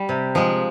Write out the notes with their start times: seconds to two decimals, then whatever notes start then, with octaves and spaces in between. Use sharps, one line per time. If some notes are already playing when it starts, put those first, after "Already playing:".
Already playing: G3
0.09 C3
0.35 F3 G#3